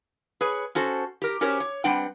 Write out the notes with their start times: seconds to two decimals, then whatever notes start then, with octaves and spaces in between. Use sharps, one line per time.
0.41 G#4 B4 C#5
0.75 C#4 F#4 A4 C5
1.22 G4 A#4
1.41 C#4 F#4 G4 A#4 C5 C#5
1.60 C#5
1.84 G3 C4 D4 B4 F#5 G5